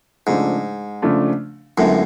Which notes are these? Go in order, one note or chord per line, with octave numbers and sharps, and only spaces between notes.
G#2 C#3 F3 A3 D4
C#3 F3 A3 D4
F#2 A2 D3 G#3 B3 F4